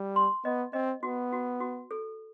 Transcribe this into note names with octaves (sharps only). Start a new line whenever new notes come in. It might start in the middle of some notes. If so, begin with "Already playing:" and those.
Already playing: G3
C6
B3 D#5
C4 D#5
B3 F#4
F#4
F#4
A4